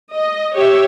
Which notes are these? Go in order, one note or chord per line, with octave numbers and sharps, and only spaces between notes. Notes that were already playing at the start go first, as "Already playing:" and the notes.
D#5
G4 C#5 E5